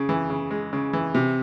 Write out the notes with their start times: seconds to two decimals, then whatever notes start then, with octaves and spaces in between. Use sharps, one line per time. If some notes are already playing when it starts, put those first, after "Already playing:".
Already playing: C#3
0.09 E3
0.30 C#3
0.51 G#3
0.73 C#3
0.93 E3
1.15 C3